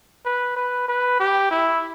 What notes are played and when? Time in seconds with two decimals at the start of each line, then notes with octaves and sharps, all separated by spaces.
0.25 B4
0.56 B4
0.88 B4
1.20 G4
1.51 E4